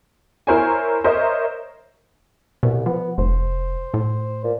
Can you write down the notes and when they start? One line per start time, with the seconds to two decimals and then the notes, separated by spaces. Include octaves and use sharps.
0.47 E4 A#4 C5 C#5 G#5
1.04 A#4 C5 C#5 D#5 E5
2.63 C2 B2
2.86 F3 B3
3.18 F1 C5
3.94 A2
4.44 A#2